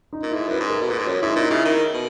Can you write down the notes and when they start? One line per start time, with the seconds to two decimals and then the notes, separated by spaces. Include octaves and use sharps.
0.13 D#4
0.23 A#2
0.31 G#2 E4
0.48 F#2 B4
0.60 G#2
0.70 A#4
0.81 B2
0.89 A#2 B4
0.99 G#2
1.07 F#2 C#5
1.22 G#2 E4
1.36 A#2 D#4
1.50 C#3 E4
1.65 D#3
1.94 B2